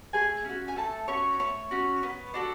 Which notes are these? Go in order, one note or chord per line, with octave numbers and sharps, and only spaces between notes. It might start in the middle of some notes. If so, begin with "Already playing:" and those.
A3 G#4 G#5
C#4 F#4
G#5
A3 A4 A5
C#4 F#4 C#5 C#6
A3 C#5 C#6
C#4 F#4
B3
D4 F#4 A4